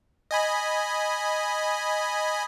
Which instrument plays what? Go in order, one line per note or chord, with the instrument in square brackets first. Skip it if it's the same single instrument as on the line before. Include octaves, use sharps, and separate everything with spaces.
[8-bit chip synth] D#5 G#5 B5